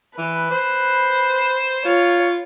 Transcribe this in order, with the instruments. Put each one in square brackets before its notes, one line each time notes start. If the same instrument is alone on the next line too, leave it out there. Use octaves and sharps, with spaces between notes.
[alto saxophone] E3 [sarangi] B4
[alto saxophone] C5
[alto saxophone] F4 [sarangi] C#5